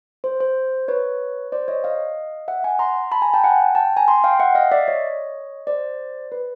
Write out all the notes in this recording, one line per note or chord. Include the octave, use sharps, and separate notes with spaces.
C5
C5
B4 C#5
C5 D5
C#5 D#5
D#5 F5
E5 F#5
F#5 G#5
A#5 C6
A5 B5
G#5 A#5
G5 A5
F#5 G#5
G5 A5
G#5 A#5
A#5 C6
F5 G5
E5 F#5
D#5 F5
D5 E5
C#5 D#5
C5 D5
B4